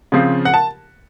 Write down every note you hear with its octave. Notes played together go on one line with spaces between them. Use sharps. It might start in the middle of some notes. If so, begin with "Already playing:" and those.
C#3 F3 C4 F4
F#5
A5